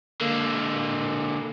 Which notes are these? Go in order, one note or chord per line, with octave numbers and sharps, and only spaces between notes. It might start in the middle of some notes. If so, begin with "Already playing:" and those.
D3 A#3